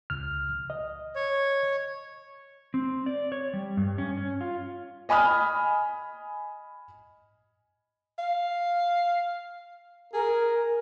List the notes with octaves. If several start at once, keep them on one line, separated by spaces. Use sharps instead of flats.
C#2 F6
D#5
C#5
C4
D5
C#5
G3
G2
C#4
C#4
F4
D#5 G#5 B5 D#6 F6
F5
G#4 A#4